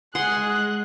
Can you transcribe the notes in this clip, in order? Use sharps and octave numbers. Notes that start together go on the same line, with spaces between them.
G#3 G#4 F#5 C6 F#6